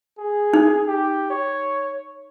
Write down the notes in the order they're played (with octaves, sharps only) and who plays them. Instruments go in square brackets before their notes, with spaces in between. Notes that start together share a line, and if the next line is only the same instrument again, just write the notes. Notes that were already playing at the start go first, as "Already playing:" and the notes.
[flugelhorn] G#4
[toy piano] D#4
[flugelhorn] G4
C#5